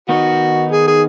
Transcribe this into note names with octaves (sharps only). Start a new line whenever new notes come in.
D#3 B3 D#4 F#4
G#4
G#4